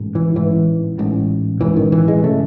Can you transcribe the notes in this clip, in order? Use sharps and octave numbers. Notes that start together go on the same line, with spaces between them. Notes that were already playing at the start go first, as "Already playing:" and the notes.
Already playing: A1 G#2
E3
A1 G#2 E3
A1 G#2
A1 G#2 E3
D#3
E3
G#3
C#3 A3